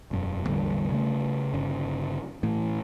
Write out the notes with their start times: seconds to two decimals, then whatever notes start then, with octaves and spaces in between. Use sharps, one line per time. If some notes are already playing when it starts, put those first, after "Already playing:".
0.11 E1 F#2
0.46 A1 E2 D3 G3
0.91 C#3 A3
1.54 G1 C#3
2.43 A2 E3